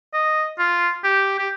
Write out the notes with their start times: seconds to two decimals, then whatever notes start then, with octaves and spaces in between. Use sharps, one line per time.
0.14 D#5
0.59 F4
1.04 G4
1.39 G4